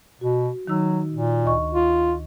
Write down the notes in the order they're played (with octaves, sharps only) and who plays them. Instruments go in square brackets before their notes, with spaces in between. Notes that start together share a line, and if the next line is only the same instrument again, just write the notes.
[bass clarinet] B2 [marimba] F#4
[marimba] D#3 D#4 E6 [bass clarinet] F#3
[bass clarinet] A#2
[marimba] D2 D#5 C#6
[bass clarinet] F4